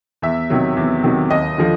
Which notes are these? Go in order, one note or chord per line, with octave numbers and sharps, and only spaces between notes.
E2 E5
C3 D#3 F#3
E2
C3 D#3 F#3
D#2 D#5
D3 F3